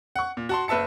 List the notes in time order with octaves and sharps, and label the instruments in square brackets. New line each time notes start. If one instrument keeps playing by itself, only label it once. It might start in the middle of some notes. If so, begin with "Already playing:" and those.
[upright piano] F#5 C#6
A#2
F#4 A5 C6
F#1 B4 E5 A5 C#7